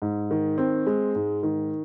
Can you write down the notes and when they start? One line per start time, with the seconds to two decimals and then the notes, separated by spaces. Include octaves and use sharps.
0.02 G#2
0.31 D#3
0.58 C4
0.86 G#3
1.15 G#2
1.43 D#3